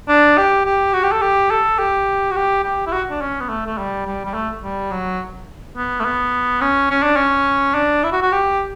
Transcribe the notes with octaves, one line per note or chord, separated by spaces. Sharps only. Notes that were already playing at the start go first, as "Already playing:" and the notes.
D4
G4
G4
F#4
G4
A4
G4
A4
G4
F#4
G4
G4
E4
F#4
D4
C#4
B3
A3
A3
G3
G3
G3
A3
G3
F#3
B3
A3
B3
C#4
C#4
D4
C#4
D4
E4
F#4
F#4
G4